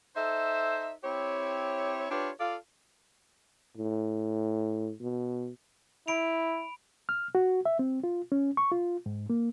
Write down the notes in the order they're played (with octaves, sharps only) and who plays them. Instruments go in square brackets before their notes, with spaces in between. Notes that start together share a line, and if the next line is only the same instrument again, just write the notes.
[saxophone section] D#4 A4 C5 E5
C4 E4 G4 C#5
D4 F4 G4 B4 C#5
F4 A4 D5 F5
[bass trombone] A2
B2
[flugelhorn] E4 [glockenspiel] B5 D7 F7
[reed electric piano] F6
F#4
E5
C4
F4
C#4
C#6
F4
G#2
A#3